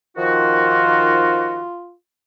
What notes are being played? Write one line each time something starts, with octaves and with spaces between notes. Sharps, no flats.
D#3 F3 F4 F#4